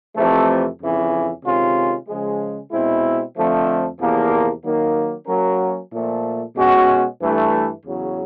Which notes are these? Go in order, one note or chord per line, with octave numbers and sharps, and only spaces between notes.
F2 C3 E3 A3
F2 C#3 E3
C3 D#3 G#3 C#4 F4
C#3 F3 G#3
B2 G#3 C4 E4
F2 D3 F3 A3
E2 C3 F3 A#3
D#3 F#3 A#3
F#3 A#3 C#4 F#4 A#4
A#2 F3 A3
B2 G#3 C#4 F#4
G2 E3 A3
E2 C#3 F#3